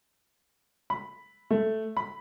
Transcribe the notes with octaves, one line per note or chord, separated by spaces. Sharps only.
B5
A3
B5